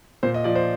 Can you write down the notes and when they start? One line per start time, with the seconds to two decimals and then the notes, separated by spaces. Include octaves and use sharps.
0.23 A#2 C5
0.34 D#5
0.44 F3 D5
0.55 C5